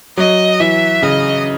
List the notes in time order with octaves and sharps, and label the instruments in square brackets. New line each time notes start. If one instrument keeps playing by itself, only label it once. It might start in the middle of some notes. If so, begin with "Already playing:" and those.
[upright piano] F#3 [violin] D#5
[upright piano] E3 [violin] E5
[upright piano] C#3 [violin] D#5